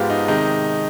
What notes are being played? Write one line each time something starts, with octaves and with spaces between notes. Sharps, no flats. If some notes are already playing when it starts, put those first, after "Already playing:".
Already playing: G#2 F3 G#3 B3 F4 G4
D#4
C3 D#3 G#3 D#4